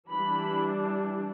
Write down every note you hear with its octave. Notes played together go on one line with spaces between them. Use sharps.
E3 G3 D4 B5